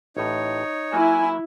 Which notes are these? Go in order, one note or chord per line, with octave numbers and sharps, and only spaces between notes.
A1 A2 D#4 C#5
F#3 A#3 E4 F#4 G#5